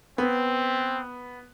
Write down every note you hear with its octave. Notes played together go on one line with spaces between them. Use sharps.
B3 C4